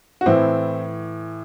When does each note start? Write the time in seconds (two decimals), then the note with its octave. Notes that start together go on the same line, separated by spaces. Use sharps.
0.21 F#4
0.26 A2 E3 C4 E4